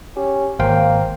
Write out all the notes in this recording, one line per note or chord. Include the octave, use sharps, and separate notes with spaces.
C#4 G4
G#1 A#3 C5 F5 G5